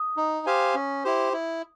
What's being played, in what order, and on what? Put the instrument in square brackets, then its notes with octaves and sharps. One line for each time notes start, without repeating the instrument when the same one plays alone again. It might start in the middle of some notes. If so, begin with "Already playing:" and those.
Already playing: [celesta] D#6
[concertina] D#4
G4 C5 F5 G#5
C#4
E4 G4 C5
E4